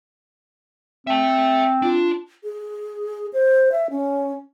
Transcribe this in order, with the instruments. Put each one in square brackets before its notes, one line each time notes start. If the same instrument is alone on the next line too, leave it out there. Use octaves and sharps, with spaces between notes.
[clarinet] C4 [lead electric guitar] E5 A5
[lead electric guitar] D4 [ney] F4
[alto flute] G#4
C5
E5
C#4